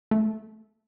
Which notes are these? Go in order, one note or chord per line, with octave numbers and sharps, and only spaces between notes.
A3